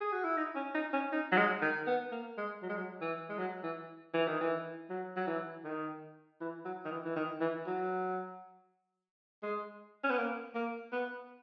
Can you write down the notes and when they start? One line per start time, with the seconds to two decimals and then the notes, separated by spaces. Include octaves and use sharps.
0.01 G#4
0.12 F#4
0.24 E4
0.37 D#4
0.56 C#4
0.74 D#4
0.93 C#4
1.12 D#4
1.32 F#3
1.37 G#3
1.62 D#3
1.87 B3
2.12 A#3
2.38 G#3
2.62 F#3
2.70 G#3
2.77 F#3
3.01 E3
3.29 G#3
3.38 F#3
3.63 E3
4.14 E3
4.28 D#3
4.41 E3
4.90 F#3
5.16 F#3
5.27 E3
5.64 D#3
6.40 E3
6.65 F#3
6.85 D#3
6.91 E3
7.04 E3
7.16 D#3
7.41 E3
7.66 F#3
9.43 G#3
10.03 C#4
10.10 B3
10.18 A#3
10.55 A#3
10.92 B3